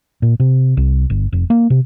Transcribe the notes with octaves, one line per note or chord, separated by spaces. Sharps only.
A#2
C3
C2
G1
F1
A#3
C3